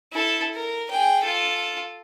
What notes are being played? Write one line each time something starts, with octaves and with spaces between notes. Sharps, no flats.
E4 A4
A#4
G#4 G5
F4 A4